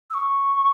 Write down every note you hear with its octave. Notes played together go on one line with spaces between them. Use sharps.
E6
C#6